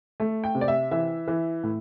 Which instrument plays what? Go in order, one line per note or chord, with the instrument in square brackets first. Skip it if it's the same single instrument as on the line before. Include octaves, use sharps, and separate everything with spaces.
[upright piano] A3
G5
C3
D5
E5
E3 E5
E3
A2